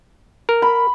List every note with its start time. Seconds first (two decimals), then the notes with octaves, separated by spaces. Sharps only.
0.49 A#4
0.62 B5